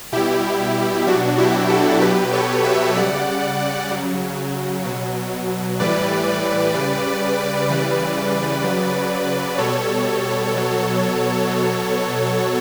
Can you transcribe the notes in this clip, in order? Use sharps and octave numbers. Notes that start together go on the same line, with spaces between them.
B2 G3 E4 G4
B2 F#3 D4 F#4
E4 G4
F#4 A4
B2 F#3 G4 B4
A4 C#5
C#5 E5
C#3 G3 D5 F#5
D5 F#5
C#3 F#3
B2 F#3
A2 E3 G3 B4 D5
C#3 G3
C#3 E3 G3 B4 D5
C#3 F#3
B2 G3 A4 C#5
B2 F#3
B2 F#3